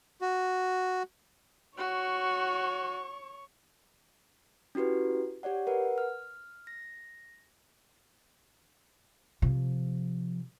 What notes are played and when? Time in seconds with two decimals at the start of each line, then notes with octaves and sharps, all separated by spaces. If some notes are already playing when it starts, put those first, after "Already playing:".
0.21 F#4
1.78 F#4 C#5 C#6
4.75 C#4 E4 F#4 G4 B4
5.43 G4 C#5 D5 F#5
5.67 A#4 B4 F#5
5.98 F6
6.67 A#6
9.42 C3 F3